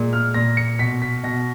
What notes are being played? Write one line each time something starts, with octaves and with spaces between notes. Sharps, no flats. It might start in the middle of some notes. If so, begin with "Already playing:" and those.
Already playing: A#2 G#3
F6
A#2 A#6
C#7
B2 B6
B6
B2 A#6